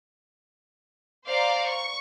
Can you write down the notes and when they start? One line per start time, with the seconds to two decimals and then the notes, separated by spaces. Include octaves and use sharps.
1.27 C5 D5 F5 A#5 D6
1.66 C#6